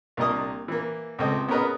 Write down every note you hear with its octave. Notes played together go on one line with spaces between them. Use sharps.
C2 A#2 D4 A#4 D#5 D#6
E3 A#3
C#2 A3 C4 D#5
B3 C#4 G#4 A#4 B4 D#5